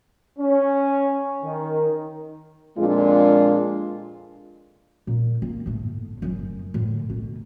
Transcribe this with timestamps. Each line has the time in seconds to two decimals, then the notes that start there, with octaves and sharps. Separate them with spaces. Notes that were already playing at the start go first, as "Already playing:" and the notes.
0.39 C#4
1.43 D#3
2.78 F2 A#2 G#3 D4 F4
5.07 A#2
5.42 A#3
5.66 G1 A2
6.22 F#1 F#2
6.74 A2 D3
7.10 B2